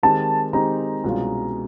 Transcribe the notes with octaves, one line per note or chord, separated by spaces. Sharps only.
D#3 G#3 C4 D#4 G4 A5
D#3 G#3 C4 D#4 G4 A#5
C2 B2 G#3 C#4 F4